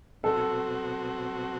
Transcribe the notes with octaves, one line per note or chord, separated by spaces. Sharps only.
B2 F#3 C4 F#4 A4